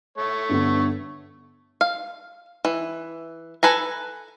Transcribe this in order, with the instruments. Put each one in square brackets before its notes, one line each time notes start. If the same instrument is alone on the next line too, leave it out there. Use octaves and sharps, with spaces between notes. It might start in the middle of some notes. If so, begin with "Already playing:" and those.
[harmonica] A3 C#5
[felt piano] G2 D3 B3
[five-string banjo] F5
E3
A4 B4 G#5 A#5